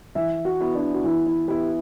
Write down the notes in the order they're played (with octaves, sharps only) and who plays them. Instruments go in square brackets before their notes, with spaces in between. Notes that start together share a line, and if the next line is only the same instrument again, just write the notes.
[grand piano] E3 [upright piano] E5
[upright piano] F#4
[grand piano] B3 E4
[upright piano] D4
F#4
[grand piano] E3 [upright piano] E4
[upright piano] E4
[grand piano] B3 E4 [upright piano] G4